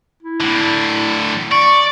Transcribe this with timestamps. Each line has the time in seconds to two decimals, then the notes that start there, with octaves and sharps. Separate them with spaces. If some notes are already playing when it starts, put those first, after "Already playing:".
0.23 E4
0.41 A2 D3
1.52 D5 C#6